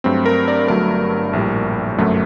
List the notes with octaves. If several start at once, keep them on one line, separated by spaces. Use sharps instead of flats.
G2 F#3 A3 C4
A#4
D5
G1 G2 F#3 A3 A#4
A#1 A2 G3
G1 F#2 F#3 A3